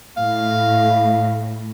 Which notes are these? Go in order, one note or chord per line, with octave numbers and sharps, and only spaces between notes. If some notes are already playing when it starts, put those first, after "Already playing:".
A2 F5